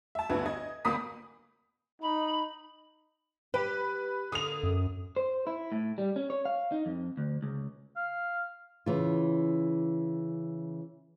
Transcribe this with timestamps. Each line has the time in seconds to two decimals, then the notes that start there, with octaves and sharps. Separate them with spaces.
0.15 E5 A5
0.30 D2 G2 B3 B4 E5 G#6
0.46 D#5 G#6
0.85 G1 D2 A#3 B5 D#6 B6
2.02 D#4 B5
3.54 G4 B4
4.32 D3 A#3 D#6 F7
4.63 F#2
5.16 C5
5.47 E4
5.72 A2
5.98 G3
6.16 C#4
6.30 C#5
6.45 F5
6.72 D#4
6.86 F2
7.17 D2
7.42 C#2
7.96 F5
8.86 C#3 E3 F4